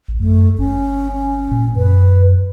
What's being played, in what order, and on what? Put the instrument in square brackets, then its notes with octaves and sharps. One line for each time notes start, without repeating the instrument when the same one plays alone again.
[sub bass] A1
[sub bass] F#2 [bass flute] A3
[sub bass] G1 [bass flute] C#4
[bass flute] C#4
[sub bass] A#2
[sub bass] F#2 [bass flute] B4